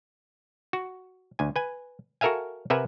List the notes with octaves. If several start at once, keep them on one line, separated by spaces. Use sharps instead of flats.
F#4
D2 G#5
B4 G#5
F#4 A4 A#4 E5 F5 G#5
C3 A#4 B4 E5 F#5 G#5